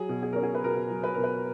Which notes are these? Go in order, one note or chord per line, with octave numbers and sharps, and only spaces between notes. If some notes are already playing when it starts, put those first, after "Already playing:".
Already playing: F#3 G#4
B2
G#4
C#4 A#4
G#4
B4
B2 A#4
F#3
B4
B2 A#4
B4